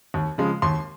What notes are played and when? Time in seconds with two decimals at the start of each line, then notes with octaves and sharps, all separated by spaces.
0.14 D#2
0.38 C#3 F3 G#3
0.62 D#2 C6